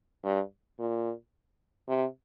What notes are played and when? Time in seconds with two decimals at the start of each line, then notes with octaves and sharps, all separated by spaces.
0.24 G2
0.79 A#2
1.88 C3